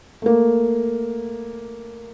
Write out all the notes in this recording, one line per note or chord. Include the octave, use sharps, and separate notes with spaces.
A3 A#3